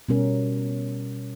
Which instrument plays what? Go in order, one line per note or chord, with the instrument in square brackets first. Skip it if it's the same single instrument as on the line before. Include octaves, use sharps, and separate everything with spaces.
[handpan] B2 G3 C#4 A#4